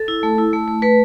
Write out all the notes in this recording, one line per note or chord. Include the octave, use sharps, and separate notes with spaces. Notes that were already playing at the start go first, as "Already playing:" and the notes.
Already playing: A4
E4
A3
E4
A3
A3
A3 B4